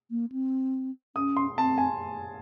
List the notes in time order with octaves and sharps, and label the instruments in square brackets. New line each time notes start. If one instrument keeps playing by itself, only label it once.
[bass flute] A#3
C4
[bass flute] C#4 [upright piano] D#6
[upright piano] C6
[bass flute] C4 [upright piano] A5
[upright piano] G#5